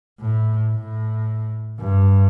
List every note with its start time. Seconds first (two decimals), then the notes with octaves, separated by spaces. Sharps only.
0.20 A2
0.74 A2
1.79 G2